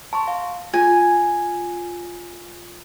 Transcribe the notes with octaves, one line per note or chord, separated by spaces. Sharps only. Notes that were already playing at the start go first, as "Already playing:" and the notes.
A5 C6 C#6
F5
F4 G#5